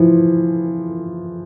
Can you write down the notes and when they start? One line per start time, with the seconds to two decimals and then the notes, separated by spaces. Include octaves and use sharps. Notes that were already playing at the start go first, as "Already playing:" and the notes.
Already playing: E3 F3